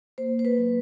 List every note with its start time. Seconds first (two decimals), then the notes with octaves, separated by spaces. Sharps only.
0.18 A#3 C5
0.39 C5
0.45 B4
0.58 F#3